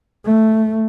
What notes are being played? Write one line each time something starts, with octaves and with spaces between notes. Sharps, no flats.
A3